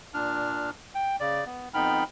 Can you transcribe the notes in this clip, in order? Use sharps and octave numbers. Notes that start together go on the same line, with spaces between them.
A#2 D4 F6
G5
C#3 D5
B3
F2 B3 D#4 G5 B5 F6